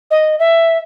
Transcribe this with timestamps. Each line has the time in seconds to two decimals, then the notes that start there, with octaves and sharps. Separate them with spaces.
0.11 D#5
0.39 E5